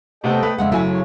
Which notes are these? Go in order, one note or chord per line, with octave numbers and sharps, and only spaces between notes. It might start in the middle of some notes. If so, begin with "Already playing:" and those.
C3 A3 B3 A4 D#5 G5
A3 B4
F2 C#3 G#3 E5 F#5
F#1 F#3 A3 E4 G#5
C#3 C#5